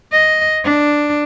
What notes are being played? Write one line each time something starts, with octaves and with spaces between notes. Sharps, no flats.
D#5
D4